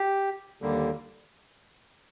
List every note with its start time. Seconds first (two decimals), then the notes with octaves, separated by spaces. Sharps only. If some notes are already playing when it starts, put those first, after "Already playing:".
Already playing: G4
0.62 D#2 D3 G3 A#3